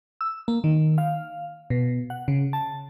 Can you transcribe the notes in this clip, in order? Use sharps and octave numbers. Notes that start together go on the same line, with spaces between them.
E6
A#3
D#3
F5
B2
F#5
C#3
A5